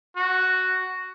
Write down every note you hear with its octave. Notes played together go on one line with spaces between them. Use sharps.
F#4